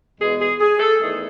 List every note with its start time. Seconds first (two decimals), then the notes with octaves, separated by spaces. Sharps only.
0.19 E2 B2 G#3 B3 G#4
0.39 G#4
0.60 G#4
0.79 A4
1.01 E2 D#3 A3 G#4